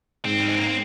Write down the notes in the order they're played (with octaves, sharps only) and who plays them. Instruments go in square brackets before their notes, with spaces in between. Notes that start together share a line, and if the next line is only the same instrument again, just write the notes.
[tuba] G#2 [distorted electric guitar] C4
[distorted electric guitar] G3
G#3
A#3
C4